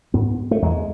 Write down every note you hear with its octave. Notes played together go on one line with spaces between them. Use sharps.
G#2 B3
A3
E2 G#3